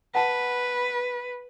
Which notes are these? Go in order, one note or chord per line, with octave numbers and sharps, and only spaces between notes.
B4 F#5 A5